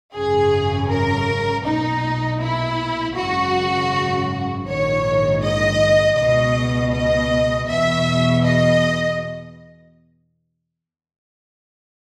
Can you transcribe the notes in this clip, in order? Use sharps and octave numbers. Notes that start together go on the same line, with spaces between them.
G#1 F#2 C#3 G#4
A#4
B1 A#2 D#4
E4
G#1 F#2 C#3 F#4
A#1 G#2 D#3 C#5
D#5
C#2 B2 D#5
D#5
E2 B2 E5
D#5